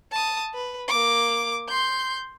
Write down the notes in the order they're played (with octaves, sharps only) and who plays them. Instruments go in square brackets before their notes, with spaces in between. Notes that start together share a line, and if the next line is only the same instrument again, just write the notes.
[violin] A5 D#6
B4
A#3 D6
C6 G6